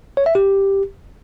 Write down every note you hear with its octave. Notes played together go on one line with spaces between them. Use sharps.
C#5
E5
G4